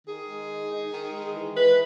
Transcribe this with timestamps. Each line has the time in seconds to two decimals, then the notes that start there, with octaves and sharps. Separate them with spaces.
0.06 D#3 G#4
0.27 G#3
0.49 D#4
0.70 D#4
0.92 D#3
1.13 G#3
1.34 E3
1.55 E3 B4